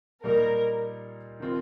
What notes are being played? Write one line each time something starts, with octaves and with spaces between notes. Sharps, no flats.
A#2 G3 A#3 D#4 A#4
D#3 C4 F4